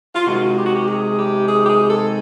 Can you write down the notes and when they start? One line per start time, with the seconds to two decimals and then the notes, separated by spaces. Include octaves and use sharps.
0.15 F4
0.27 C3 D#3 G#3 F#4
0.58 G4
0.66 F#4
0.76 G4
0.88 G#4
1.18 G4
1.49 G#4
1.65 G4
1.69 G#4
1.89 A4